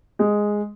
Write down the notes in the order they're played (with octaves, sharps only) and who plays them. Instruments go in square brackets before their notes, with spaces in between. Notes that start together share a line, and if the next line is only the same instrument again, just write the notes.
[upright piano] G#3